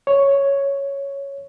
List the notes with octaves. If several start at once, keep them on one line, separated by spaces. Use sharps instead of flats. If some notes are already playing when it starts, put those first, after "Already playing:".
C#5